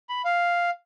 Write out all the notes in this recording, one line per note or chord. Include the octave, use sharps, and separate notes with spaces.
B5
F5